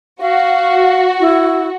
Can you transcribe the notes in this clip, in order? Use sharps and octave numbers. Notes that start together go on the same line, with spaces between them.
F#4 F5
E4